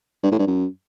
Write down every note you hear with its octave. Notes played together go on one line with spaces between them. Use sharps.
G2
A2
G2
F#2